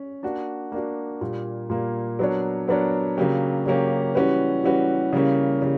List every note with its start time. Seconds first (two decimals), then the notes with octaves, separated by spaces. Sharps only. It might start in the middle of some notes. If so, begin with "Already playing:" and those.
Already playing: C#4
0.23 A#3 D4 F#4
0.72 A#3 D4 F#4
1.21 A#2 G3 A#3
1.70 A#2 G3 A#3
2.19 F#3 B3 D4 A#4 C#5
2.68 F#3 B3 D4 A#4 C#5
3.17 C#3 F#3 A#3 C#4 G4
3.66 C#3 F#3 A#3 C#4 G4
4.15 E3 G3 C#4 F#4 B4
4.64 E3 G3 C#4 F#4 B4
5.13 C#3 E3 G3 A#3 C#4
5.62 C#3 E3 G3